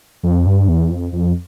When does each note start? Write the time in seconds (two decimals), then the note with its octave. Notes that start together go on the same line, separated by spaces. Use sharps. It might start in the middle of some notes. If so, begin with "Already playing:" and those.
0.23 F2
0.46 G2
0.68 E2
0.91 F2
1.13 F2